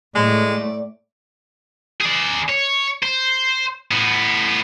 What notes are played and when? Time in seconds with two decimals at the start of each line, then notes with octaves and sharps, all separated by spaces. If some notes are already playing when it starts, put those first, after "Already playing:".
0.15 A2 G#3 A3 D5
2.01 G#4 D5
2.49 C#5
3.03 C5
3.91 A2 B3